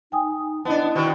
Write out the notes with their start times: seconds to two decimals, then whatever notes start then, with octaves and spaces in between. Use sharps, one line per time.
0.12 D#4 G5 G#5 D#6
0.65 B3 D4 E4 D5 D#5 A5
0.95 B2 D#3